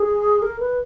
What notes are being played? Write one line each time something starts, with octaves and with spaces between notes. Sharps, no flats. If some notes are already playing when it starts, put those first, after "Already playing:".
Already playing: G#4
A#4
B4